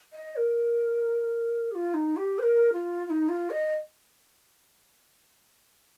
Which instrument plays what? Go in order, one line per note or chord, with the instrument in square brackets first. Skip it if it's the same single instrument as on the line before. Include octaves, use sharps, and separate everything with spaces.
[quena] D#5
A#4
G4
F4
D#4
G4
C5
A#4
F4
F4
D#4
F4
D#5